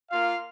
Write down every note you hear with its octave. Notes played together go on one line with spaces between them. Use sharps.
A#3 F4 F5